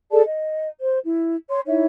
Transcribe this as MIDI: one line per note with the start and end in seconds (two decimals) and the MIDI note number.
0.11 0.21 68
0.11 0.21 69
0.11 0.21 74
0.11 0.21 81
0.26 0.69 75
0.80 1.00 72
1.04 1.37 64
1.49 1.61 73
1.49 1.61 84
1.66 1.85 63
1.66 1.85 64
1.66 1.85 73
1.66 1.85 76